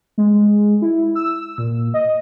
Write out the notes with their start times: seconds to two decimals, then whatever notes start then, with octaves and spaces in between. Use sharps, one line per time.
0.18 G#3
0.82 E4
1.15 E6
1.58 A#2
1.94 D#5